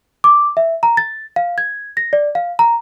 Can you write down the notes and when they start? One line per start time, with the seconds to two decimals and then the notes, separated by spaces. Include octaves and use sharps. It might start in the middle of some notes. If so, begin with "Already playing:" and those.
0.24 D6
0.57 E5
0.83 A#5
0.97 A6
1.36 F5
1.58 G#6
1.97 A#6
2.13 D5
2.35 F5
2.59 A#5